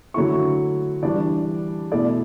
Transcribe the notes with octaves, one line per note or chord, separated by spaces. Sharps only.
D3 F#3 A3 E4 C#6
E3 G3 D4 D5
B2 A3 E4 D5